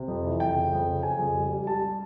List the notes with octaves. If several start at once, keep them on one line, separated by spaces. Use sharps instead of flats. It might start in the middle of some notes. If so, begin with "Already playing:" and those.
Already playing: C3
F2
E3
F2 G5
C#3
F2
C#3
C#3 G#5
F2
G3
G3
G3 A5
G3